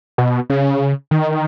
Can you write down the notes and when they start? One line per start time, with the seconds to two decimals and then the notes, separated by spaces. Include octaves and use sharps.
0.18 B2
0.50 C#3
1.11 D#3